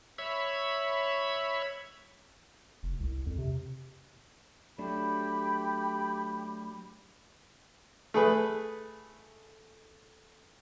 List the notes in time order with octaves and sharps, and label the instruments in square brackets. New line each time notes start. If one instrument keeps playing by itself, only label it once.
[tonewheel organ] C#5 E5 B5
[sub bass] F1
C2
F2
C3
[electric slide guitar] F#3 A3 D4 [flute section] G4 B5
[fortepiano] A3 G#4 B4